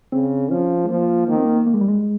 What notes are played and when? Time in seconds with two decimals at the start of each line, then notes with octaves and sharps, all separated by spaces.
0.12 C#3 C4
0.51 F3 C#4
0.85 G#3
0.89 F3 A#3
1.28 D#3 A#3
1.36 C4
1.45 A#3
1.66 A#3
1.74 G#3
1.81 G3
1.88 G#3